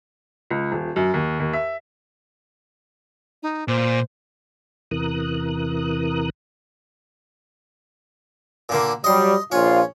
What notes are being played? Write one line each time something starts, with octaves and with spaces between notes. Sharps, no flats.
C#2
D#1
F#2
D#2
D#2
E5
D#4
A#2 C5
E2 C3 E3 A#4 D#6 F#6
A#2 D3 A#3
F#3 G3 D#5 C6
A#1 C#4 F4